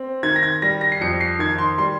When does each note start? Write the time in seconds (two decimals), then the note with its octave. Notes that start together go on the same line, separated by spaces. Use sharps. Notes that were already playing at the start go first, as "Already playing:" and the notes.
Already playing: C4
0.23 D#3 G#6
0.36 A#6
0.43 G#6
0.62 G3 A#6
0.81 A#6
0.92 C7
1.01 F2 C#7
1.21 C7
1.39 D#3 G#6
1.58 C6
1.78 G3 C6